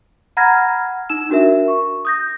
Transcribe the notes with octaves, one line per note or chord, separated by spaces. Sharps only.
F#5 A#5 B5 F6 G#6 A#6
D#4 E6 E7
D4 F#4 A#4 E5
C#6
D#6 G6 A#6